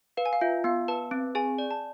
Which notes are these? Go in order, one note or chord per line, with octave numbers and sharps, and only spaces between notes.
B4 F5
G#5
F5
F4 E5
B3 F5
B4 A5
C4
G#4 G#5
D5
A5